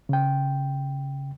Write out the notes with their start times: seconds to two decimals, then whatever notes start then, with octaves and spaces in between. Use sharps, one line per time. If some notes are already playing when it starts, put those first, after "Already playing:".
0.09 C#3 G5